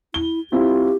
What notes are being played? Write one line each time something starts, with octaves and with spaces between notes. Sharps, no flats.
E4 G7
C4 E4 F4 G4